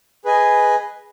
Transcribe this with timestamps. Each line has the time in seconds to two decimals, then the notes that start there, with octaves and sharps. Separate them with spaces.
0.25 G#4 B4 D#5 G#5